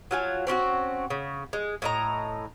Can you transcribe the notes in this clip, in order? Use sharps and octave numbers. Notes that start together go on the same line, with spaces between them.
F#3 F4 G#5
C4 C#4 F4 F#4
C#3
G#3
A2 D#5 A#5